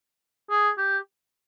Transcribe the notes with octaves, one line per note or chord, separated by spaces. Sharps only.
G#4
G4